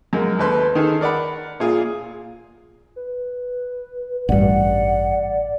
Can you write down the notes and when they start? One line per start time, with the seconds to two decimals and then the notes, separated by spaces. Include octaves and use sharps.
0.13 F#2 G#3 A#3
0.39 D#2 A4 B4 C6
0.75 D#3 D#4 G#4 A4
1.01 A#4 D5 F#5 B5
1.60 A#2 F4 G#4
2.96 B4
4.29 A1 G2 D5 F#5